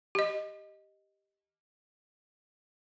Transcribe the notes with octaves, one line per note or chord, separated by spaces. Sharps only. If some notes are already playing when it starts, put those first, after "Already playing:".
G4 D#5